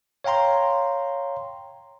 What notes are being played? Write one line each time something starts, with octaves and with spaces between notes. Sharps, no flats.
C#5 F5 G5 A#5 C6